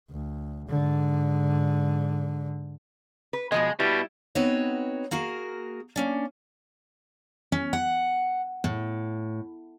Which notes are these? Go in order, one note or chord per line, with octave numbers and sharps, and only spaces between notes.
D2
G#2 D3
B4
B2 F3 G#3 D#5
B2 G3 E4
B3 C4 D#4 F#4 B4 C#5
A#3 F#4 G#4 A#4
A#3 C#4 D4
C#4
F#5
A2